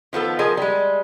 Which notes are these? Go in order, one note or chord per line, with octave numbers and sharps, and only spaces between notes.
D#3 F3 B3 A4
F3 G#4 A#4 D#5 G#5
G3 G#3